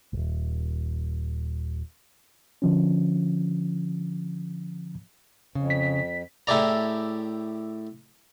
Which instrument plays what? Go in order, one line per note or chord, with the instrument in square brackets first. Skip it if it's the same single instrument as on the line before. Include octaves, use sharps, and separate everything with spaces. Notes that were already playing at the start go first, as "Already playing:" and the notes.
[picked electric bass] D#1 G#1
[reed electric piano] D3 F3 C#4
[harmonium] F2 [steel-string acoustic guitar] C#3
[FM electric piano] B6
[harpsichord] A2 E4 G4 G#4 D5 A#5